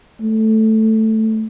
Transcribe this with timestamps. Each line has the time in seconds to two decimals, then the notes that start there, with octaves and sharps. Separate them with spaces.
0.22 A3